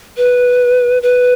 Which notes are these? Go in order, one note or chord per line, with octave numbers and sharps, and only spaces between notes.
B4
B4